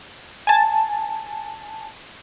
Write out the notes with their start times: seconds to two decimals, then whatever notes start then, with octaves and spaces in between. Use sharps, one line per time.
0.47 G#5 A5